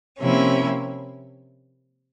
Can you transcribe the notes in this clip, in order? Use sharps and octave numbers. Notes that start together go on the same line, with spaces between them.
C3 F3 A#3 C#4 E4